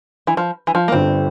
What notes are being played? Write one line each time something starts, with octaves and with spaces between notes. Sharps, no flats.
E3
F3
E3
F3
A#3
G1 G2 D3 C4